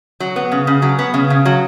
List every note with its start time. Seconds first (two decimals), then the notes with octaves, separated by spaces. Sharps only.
0.20 F#3
0.36 B3
0.52 C#3
0.67 C#3
0.82 F#3
0.99 B3
1.14 C#3
1.30 C#3
1.45 F#3